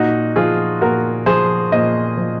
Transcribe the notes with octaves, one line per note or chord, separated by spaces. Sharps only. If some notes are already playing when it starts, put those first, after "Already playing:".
Already playing: A#2 D#4 F#4
F3 F4 G#4
A#2 F#4 A#4
F3 G#4 C5
A#2 C5 D#5
F3